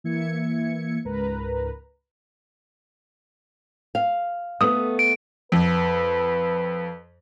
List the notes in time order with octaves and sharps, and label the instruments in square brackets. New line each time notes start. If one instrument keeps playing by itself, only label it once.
[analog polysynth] E3 A#3 E5 G#6 C#7
C#2 G#2 A#4 B4 A#5
[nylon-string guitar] F5
[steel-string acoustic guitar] A3 B3 [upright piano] D#6
[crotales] D7
[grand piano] F2 [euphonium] B4